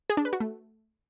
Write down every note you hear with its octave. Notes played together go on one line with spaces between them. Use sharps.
G#4
D4
B4
F#4
A3